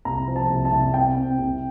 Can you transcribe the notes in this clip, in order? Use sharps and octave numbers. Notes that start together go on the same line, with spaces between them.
C2 A#5
F3
A5
C2
A5
C2
C3 G5
C3
C2